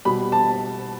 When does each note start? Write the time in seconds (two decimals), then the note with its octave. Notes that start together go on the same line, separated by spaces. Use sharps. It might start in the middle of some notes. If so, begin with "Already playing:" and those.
0.05 B2 G3 B5
0.32 A5